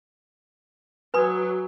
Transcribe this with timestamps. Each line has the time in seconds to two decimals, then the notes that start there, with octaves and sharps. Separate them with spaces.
1.14 F#3 B4 G#5 B5 D#6 G#6